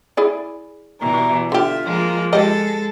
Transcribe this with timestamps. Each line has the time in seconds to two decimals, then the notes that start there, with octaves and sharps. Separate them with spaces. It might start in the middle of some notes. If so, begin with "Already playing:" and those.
0.17 E4 G#4 D5
1.01 B2 E3 G3 A#5
1.52 D3 F4 G4 E5
1.85 F3 G#3 A#3
2.33 G#3 G4 A4 D#5